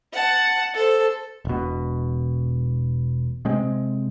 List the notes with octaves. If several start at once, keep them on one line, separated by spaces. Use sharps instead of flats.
F#5 A5
A4 C5
E1 B2
C3 G#3 C4